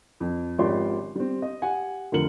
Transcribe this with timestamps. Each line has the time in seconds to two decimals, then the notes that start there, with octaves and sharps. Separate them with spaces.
0.20 F2
0.58 G#1 F3 C#4 G4 D5 C6
1.15 G3 C4
1.42 D#5
1.62 G4 F#5 G#5
2.12 F1 D3 F3 A#4 C#7 F#7